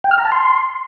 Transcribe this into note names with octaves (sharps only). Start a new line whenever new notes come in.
G5
F6
A#5
A5
C6